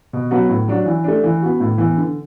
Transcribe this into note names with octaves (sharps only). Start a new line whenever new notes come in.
B2
F#3 B3 F#4
A2
F#3 D4 F#4
E3
A3 D4
E3
B3 F#4
A2
E3 B3
D3